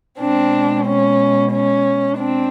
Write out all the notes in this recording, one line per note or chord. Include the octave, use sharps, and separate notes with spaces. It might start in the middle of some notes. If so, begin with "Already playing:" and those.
B2 G#3 C4 D4
C#4
C#4
C4 D4